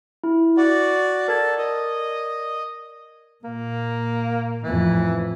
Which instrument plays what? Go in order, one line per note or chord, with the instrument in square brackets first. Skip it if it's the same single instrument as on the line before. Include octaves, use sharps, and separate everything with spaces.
[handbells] E4
[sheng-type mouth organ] F#4 D5 [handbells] F#5
[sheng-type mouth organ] A4 [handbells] A#4 D5 G#6
[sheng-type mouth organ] D#5
[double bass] A#2 [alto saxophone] A#3
[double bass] F2 A2 [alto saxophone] E3